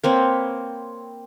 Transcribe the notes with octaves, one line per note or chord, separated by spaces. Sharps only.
A#3 C4 B4 C#5